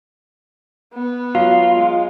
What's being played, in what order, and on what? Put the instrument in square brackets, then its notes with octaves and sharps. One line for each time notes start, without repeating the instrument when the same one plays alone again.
[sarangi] B3
[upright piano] F#3 [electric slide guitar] F4 [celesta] F5
[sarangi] G#3